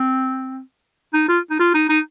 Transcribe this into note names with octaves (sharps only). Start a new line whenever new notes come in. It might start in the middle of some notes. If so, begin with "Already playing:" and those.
Already playing: C4
D#4
F4
D#4
F4
D#4
D#4